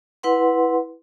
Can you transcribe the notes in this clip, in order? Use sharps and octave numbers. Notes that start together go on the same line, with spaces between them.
E4 B4 F#5 C6